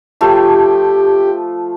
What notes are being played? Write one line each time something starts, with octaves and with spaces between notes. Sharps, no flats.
F3 A3 F4 G4